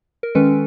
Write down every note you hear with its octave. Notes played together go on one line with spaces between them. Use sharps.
A#4
D#3 G#3 C#4 A4 B4